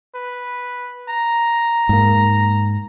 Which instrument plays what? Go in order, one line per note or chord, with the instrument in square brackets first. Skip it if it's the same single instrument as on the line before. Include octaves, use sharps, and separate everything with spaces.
[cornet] B4
A#5
[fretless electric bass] G#2 A#3